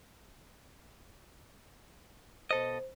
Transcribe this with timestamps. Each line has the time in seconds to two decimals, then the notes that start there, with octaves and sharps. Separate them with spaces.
2.51 B2 A4 C5 D#5